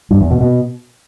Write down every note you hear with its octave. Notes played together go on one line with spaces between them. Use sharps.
G2
E2
B2
B2